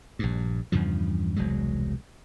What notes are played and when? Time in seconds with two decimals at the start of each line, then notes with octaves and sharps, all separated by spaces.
0.19 A#1 G2
0.72 E2 G2 C#3 F3
1.36 E1 C2 F#3 G#3